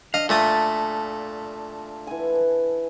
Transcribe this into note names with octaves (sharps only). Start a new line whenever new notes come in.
D4 D#5 F5
A#2 A3 A4 A5 D#6
E3 G#5